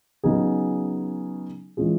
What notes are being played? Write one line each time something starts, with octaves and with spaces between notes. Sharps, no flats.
C#3 F#3 B3 D#4 G#4
E3 G#3 C#4 F4 G#4